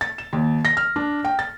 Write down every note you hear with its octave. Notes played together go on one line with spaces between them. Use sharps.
A6
E7
D#2
A#6
F6
D4
G5
A6